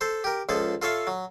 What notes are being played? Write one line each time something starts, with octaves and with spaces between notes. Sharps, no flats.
A4 C5
G4 A#4
C#2 F3 G#4 A4
F4 A4 C#5 E5 F5
F#3